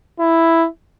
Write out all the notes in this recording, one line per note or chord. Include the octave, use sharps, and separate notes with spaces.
E4